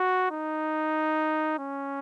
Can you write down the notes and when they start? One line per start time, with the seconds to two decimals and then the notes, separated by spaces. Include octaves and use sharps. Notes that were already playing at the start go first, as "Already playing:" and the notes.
Already playing: F#4
0.31 D#4
1.59 C#4